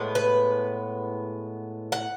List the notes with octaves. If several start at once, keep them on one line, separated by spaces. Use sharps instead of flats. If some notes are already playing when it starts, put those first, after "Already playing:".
Already playing: A2 G#3 B3
B4
F#5